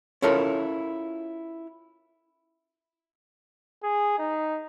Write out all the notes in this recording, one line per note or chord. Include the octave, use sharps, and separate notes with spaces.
C#4 E4 F4 A4 A#4
G#4
D#4